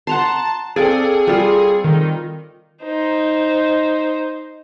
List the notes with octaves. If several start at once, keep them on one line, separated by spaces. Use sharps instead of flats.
F#5 A5 A#5 C6
C4 G#4 A4 D5 F5
G3 F4
D#3
D#4 C5